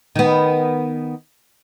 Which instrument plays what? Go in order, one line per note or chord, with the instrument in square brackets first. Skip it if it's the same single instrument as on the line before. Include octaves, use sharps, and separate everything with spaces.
[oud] D#3 B3